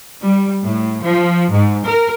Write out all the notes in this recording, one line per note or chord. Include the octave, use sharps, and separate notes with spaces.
G3
A2
F3
G#2
A#4